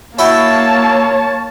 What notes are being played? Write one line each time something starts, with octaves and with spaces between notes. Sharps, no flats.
A#3 E4 F#4 C#5 G5 A5